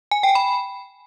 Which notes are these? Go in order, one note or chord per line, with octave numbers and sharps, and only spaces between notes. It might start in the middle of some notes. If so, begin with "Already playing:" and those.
G#5
G5
B5